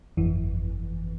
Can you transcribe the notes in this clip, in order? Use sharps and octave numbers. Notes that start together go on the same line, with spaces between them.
G1 F2 E3